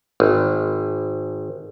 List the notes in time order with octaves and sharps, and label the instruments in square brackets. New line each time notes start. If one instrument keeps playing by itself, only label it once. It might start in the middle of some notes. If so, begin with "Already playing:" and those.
[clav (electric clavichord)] G#1